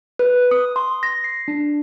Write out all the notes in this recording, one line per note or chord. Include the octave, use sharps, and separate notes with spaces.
B4
D#6
C6
A#6
C7
D4